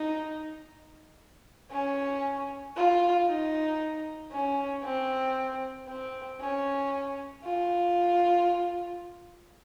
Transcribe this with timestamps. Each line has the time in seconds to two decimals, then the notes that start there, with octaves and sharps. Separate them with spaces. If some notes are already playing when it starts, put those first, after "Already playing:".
Already playing: D#4
1.72 C#4
2.76 F4
3.27 D#4
4.32 C#4
4.84 C4
5.88 C4
6.40 C#4
7.45 F4